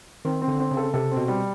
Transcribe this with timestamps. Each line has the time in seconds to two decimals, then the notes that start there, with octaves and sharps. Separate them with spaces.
0.25 D#3 C4
0.42 C4
0.48 D3
0.60 C4
0.71 C#3
0.77 A4
0.94 C3 A4
1.11 C4
1.17 B2
1.28 G3